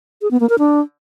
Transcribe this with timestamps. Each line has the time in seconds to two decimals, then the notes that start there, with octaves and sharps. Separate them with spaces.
0.22 G#4
0.31 B3
0.40 A#3
0.49 A#4
0.59 D4